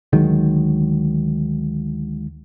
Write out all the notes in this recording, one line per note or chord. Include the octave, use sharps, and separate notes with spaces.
D2 D#3 F#3 G#3